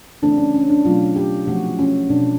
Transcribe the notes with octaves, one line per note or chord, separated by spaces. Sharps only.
C#3 E3 A3 C4 D4
C#4
C#4
D4
B2 F#3 A3 F4
G4
C3 F3 A3 F#4
C#4
B2 G#3 C4 D4